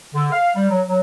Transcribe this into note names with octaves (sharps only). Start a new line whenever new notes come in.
D3
F5
G3
F#3
F#3